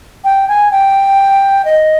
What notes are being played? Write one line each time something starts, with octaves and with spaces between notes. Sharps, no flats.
G5
G#5
G5
D#5